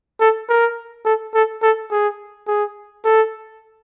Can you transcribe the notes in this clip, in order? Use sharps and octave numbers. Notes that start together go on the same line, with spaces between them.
A4
A#4
A4
A4
A4
G#4
G#4
A4